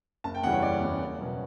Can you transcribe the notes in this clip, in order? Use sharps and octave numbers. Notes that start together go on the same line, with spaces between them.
F#1 A5
G5
E2 C#3 G3 F#5
C#5
F#1 D5
E2 C#3 G3
F#1
B2 F#3